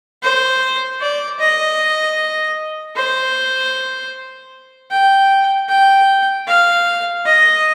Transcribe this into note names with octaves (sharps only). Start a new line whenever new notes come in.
C5
D5
D#5
C5
G5
G5
F5
D#5